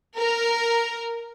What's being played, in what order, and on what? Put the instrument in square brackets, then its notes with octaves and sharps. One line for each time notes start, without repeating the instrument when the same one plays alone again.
[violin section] A#4